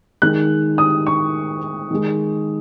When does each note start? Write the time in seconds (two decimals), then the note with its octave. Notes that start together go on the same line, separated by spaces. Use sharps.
0.22 D#3 G#3 F#6
0.78 D#6
1.07 C#6
1.91 D#3 G#3